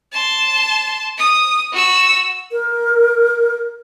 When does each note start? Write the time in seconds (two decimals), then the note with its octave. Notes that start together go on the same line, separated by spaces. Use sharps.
0.13 A5 C6
1.18 D#6
1.73 F#4 E6
2.52 A#4